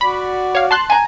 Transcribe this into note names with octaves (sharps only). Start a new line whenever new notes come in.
F#4 D5 B5
C#5 F5
A5 C6 F#6
G#5 A#5